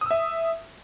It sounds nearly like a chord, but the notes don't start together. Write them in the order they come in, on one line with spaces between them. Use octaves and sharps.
D#6 E6 E5